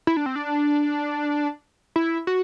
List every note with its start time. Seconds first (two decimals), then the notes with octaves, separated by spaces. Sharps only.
0.07 E4
0.17 D4
0.26 C4
0.36 D4
1.96 E4
2.27 F#4